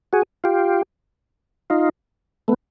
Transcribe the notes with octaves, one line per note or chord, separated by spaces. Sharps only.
F#4 G#4
F4 G4
D#4 F4
A3 B3